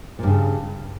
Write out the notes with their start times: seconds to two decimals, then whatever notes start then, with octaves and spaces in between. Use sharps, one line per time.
0.19 A#2
0.23 G2
0.27 C#3